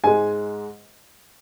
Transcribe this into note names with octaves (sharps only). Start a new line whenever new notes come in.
G#2 G#3 G#5